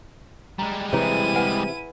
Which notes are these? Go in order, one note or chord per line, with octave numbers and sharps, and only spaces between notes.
G3 G#3 A#5
C3 E3 E4 G#4 C#5 A#5 D#7
B4 F#5 G#5